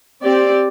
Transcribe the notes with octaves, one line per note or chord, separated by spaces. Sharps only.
C4 G4 D5